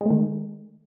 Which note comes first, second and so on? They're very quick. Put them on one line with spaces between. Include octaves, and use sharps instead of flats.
G#3 A3 D#3